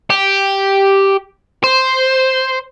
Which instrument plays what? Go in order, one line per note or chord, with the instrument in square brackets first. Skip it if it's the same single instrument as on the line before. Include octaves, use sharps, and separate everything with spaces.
[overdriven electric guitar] G4
C5